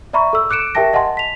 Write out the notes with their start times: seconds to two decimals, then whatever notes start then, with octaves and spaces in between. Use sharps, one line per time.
0.13 D5 E5 A#5 B5 C#6
0.33 A4 E6
0.50 D6 F#6 C#7 D7 E7
0.75 G4 A#4 E5 G5 A5 A#6
0.93 D#5 F#5 G#5 A5 C6
1.17 B6 F7